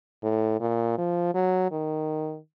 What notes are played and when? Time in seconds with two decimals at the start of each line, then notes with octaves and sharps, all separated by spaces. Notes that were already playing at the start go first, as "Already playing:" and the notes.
0.23 A2
0.60 A#2
0.97 F3
1.34 F#3
1.71 D#3